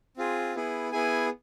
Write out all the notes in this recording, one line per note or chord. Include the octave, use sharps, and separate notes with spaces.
C4 F4 G#4
B3 E4 G#4
B3 E4 G#4 G#5